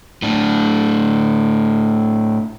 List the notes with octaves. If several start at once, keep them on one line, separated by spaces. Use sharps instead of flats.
A2 D4